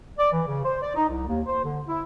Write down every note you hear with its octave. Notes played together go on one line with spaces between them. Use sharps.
D5
E3
C#3
C5
D5
D#4
C2
D#2
C5
D3
E4